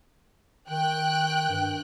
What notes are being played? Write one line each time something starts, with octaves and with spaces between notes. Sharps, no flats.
D#3 G5 F#6
G2